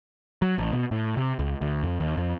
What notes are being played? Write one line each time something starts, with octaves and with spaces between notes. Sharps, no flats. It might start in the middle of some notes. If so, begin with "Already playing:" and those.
F#3
A1
B2
A2
C3
C#2
D2
F2
D#2
F2